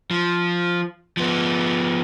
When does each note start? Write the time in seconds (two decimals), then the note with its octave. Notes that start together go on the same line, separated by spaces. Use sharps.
0.11 F3
1.17 F3 B3